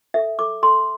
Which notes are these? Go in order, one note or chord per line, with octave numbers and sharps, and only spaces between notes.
A4 E5
A4 D6
A4 C6